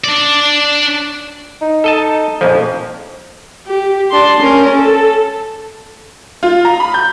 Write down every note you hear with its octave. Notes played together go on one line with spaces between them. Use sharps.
D4 D5
D#4
A4 D#5 A5
A#1 F2 F3
G4
D4 C6
C#4 A#4
A4
F4
A#5
B5
G6